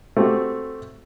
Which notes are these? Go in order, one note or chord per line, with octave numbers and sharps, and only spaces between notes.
A3 C4 F#4 G4